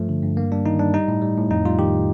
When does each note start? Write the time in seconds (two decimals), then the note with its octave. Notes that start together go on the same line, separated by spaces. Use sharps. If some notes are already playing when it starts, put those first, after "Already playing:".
Already playing: G2 F3 A3
0.09 D3
0.23 G2
0.37 G2 A#3
0.52 G3 D4
0.66 D#3 D#4
0.79 G2 D4
0.94 G3 D#4
1.08 A2
1.22 G3
1.37 A2
1.50 F2 D#4
1.65 G3 F4
1.79 D#3 G4